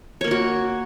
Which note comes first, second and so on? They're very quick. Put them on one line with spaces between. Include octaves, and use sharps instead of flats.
C#5 A#3 A#4 F#4